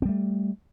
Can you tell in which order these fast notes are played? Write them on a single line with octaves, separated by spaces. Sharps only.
C4 G3 A3